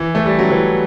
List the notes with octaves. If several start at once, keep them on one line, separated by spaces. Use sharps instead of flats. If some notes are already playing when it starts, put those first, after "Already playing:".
Already playing: E3
A3
G3
F#3
E3